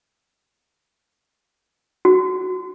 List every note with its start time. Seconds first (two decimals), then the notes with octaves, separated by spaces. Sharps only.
2.05 F#4